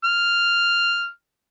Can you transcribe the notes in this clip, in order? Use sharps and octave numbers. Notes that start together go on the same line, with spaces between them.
F6